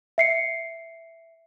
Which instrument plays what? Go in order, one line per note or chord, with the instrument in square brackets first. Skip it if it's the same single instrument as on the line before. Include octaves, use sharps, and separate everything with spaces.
[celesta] E5 C7 C#7